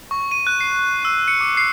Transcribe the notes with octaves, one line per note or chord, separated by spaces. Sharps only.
C#6
D#7
F#6
C7
E6
C#7
D6
C7